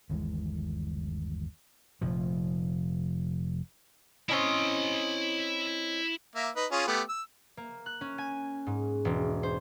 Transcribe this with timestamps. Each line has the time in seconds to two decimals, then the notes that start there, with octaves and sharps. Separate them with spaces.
0.10 G1 D#2 E3 G#3
2.01 F1 A#2 F3
4.29 C4 C#4 E4 D#5 C6
6.35 A#3 E5
6.56 D#4 B4
6.72 C#4 F4 G#4
6.88 A3 B3 G4
7.09 E6
7.57 A#3
7.86 F#6
8.01 C#4
8.18 G#5
8.67 G#2
9.05 E1
9.43 C5